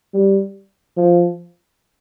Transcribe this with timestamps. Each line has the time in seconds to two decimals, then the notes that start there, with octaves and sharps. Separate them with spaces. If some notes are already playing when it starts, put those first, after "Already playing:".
0.14 G3
0.97 F3